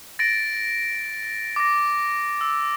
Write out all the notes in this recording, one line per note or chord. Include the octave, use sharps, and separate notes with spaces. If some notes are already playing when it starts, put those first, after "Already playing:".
A6 A#6 D7
D6 A#6
E6